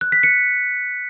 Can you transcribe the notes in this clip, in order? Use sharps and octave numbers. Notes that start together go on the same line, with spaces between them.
F#6
B6
C#7